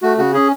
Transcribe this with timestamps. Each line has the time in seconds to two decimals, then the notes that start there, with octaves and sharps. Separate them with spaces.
0.02 A3 F#4
0.18 C#3 F#4
0.33 C#4 G#4